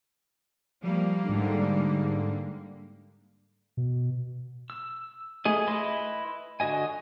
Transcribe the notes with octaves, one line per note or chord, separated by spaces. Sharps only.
F3 G3 A#3
G#2 D3
B2
E6
A3 G#4 D#5
E4 B4 D#5 C6
D3 F#4 D#5 G#5